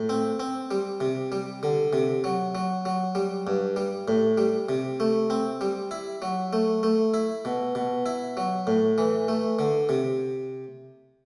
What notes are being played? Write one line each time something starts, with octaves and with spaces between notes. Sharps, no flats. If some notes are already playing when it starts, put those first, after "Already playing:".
Already playing: A2
C4
C4
G3
C3
G3
D3
C3
F#3
F#3
F#3
G3
G2
G3
A2
G3
C3
A3
C4
G3
E4
F#3
A3
A3
E4
B2
B2
E4
F#3
A2
E3
A3
D3
C3